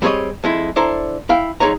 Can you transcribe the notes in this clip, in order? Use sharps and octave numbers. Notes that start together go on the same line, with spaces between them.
G3 C4 G#4 A#4 C#5 D#5
F2 G#3 E4
D4 E4 A4 C5 A#5
E4 F5 G5
F2 E3 G#3 D#4 C#5 A#5